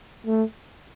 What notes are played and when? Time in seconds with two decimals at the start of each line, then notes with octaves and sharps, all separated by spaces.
0.27 A3